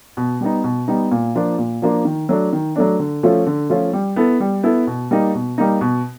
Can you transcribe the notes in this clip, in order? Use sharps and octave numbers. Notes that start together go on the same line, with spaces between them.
B2
G3 B3 D#4
B2
G3 B3 D#4
A#2
F3 A#3 D4 F4
A#2
F3 A#3 D4 F4
D#3
F#3 A3 D4
D#3
F#3 A3 D4
D3
F3 A3 C#4 F4
D3
F3 A3 C#4 F4
G3
B3 E4 A4
G3
B3 E4 A4
B2
G3 A#3 D#4
B2
G3 A#3 D#4
B2